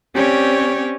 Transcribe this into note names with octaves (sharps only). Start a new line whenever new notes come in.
C4 C#4 G4 C#5 D5